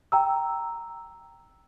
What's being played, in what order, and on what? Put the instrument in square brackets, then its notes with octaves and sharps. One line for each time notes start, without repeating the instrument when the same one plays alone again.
[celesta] G5 A#5 E6